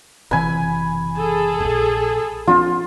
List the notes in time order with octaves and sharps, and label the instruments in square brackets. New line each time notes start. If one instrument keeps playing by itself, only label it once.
[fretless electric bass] F#1 C3 E3 [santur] G#5 B5
[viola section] G#4 A4
[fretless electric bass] D1 A#1
[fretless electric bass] F3 C4 D4 [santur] F4